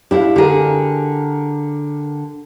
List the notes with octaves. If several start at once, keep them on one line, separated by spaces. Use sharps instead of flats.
D4 E4 G4 F5
D3 G4 G#4 A#4